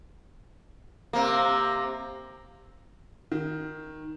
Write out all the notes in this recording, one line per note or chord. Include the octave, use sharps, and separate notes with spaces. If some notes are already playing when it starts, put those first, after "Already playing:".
C3 A#3
D#3